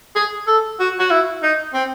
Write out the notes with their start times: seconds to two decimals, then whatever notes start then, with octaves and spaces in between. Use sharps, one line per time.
0.16 G#4
0.47 A4
0.80 F#4
0.99 F#4
1.11 E4
1.43 D#4
1.74 C4